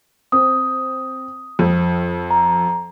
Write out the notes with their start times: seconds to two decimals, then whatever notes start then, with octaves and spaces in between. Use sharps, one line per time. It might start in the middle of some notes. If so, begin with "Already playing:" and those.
0.32 C4 D#6
1.59 F2
2.30 A#5